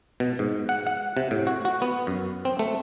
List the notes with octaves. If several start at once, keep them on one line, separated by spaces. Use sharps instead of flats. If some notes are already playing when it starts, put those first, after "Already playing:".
B2
G#2
F#5
F#5
C3
A2
F#4
F#4
B3
F#2
C4
A3